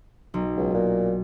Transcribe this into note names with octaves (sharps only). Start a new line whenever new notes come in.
B1
C#2
A#2